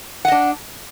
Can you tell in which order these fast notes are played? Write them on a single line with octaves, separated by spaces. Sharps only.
F#5 D#5 D4